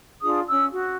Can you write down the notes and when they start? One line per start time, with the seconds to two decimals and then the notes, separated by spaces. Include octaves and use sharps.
0.22 D4 F4 G#4 D#6
0.49 C#4 E6
0.70 F#4